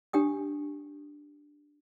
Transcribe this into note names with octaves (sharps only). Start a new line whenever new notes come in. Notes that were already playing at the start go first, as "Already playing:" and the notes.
D4 G4 G5 D#6